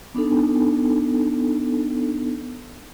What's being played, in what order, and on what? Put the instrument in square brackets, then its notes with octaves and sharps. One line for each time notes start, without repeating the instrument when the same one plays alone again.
[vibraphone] B3 D4 D#4 A4